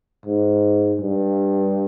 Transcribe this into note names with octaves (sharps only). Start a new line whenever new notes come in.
G#2
G2